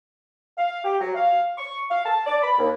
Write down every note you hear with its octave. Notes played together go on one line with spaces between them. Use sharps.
F5
G4
F#3
F5
C#6
F5
A5
D5
B5
D#2